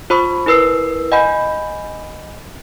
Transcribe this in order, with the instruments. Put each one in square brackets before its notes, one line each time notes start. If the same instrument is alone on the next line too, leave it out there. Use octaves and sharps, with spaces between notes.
[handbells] F4 C5 B5 C#6 D#6
E4 A#4 B4 E6 C7
D#5 F#5 G#5 B5 G6